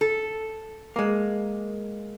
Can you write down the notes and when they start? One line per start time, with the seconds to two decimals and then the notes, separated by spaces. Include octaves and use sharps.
0.01 A4
0.96 G#3 A#3